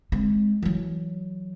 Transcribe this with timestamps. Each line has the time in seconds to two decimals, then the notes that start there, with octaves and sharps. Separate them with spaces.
0.12 G#3 C4
0.62 E3 F#3